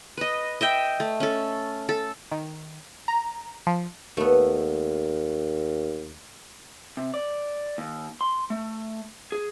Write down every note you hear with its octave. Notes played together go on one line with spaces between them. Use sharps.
B4 D#5
D#5 E5 G5
A3
C#4 A4
A4
D#3
A#5
F3
D#2 A3 B3
C3
D5
D#2
C6
A3
G#4